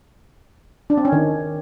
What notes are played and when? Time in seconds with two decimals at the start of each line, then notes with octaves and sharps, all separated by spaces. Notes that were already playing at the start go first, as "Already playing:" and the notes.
0.90 D4
0.97 C4
1.05 C#4
1.12 D#3